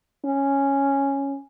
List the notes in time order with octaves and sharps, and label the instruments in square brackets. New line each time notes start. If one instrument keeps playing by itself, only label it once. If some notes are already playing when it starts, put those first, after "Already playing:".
[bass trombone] C#4